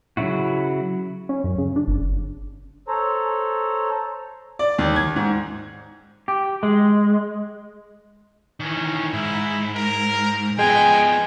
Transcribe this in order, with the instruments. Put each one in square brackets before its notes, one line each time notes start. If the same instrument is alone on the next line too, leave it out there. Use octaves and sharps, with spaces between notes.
[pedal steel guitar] C#3 F#3 E4 F#4
[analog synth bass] C#4
F#2
C#3
D4
G1
[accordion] A4 C5 C#5 A#5
[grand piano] D5
D#2
G#6
G#2
[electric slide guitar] G4
G#3
[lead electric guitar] D#3 E3 [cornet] C#4
[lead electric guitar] G#2 [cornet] E4
[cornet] A#4
[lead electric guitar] F3 B3 [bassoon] G#3 [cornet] G5 [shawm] G#5